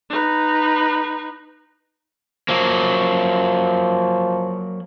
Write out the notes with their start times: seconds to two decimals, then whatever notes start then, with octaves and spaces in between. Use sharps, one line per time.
0.10 D#4 B4
2.48 F3 F#3 A#3